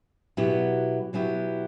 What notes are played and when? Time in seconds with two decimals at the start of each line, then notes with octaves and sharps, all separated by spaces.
0.37 B2 F#3 B3 E4 G4
1.13 B2 F#3 B3 E4 G4